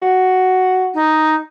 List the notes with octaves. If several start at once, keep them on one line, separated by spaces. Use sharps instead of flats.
F#4
D#4